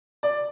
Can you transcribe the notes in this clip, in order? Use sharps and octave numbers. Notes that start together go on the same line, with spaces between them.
D5